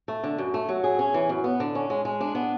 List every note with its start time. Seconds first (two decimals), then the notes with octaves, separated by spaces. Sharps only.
0.08 A3
0.24 D3
0.38 F#2
0.54 A3
0.69 F#3
0.84 G#4
0.99 C#4
1.14 E3
1.29 F#2
1.44 B3
1.60 D3
1.75 C#4
1.90 G#3
2.05 G#3
2.20 D4
2.35 B3